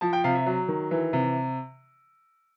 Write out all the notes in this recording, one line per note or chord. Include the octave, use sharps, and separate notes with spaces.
F3 A5
G5
C3 F5
E5
F#3
D#3
E3
C3